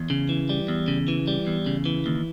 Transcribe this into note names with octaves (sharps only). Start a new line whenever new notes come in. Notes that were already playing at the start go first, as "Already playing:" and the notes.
Already playing: E2
C#3
E3
G3
E2
C#3
E3
G3
E2
C#3
E3
D#2